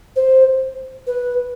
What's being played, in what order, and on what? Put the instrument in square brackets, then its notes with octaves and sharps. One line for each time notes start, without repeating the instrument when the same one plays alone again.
[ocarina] C5
B4